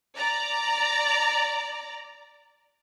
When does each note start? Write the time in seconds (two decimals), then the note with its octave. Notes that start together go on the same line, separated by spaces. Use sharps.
0.16 D5 A#5